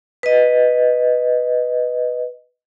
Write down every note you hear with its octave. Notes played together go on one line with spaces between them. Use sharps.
B4 D#5